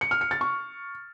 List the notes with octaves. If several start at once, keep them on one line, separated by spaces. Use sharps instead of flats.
C#7
F6
C#7
A6
C#6